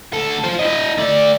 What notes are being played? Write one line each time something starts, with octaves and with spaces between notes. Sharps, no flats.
D2 A4
F4 C5
E4 D#5
A3 D5